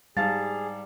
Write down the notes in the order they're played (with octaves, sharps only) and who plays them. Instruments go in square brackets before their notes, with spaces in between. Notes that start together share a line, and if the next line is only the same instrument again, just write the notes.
[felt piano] G#2 F5 A5 [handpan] G3 [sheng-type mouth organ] G#4 [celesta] A6